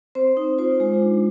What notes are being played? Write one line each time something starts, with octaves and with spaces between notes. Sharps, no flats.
C4 C5
D#4
F4 C5
G#3
D4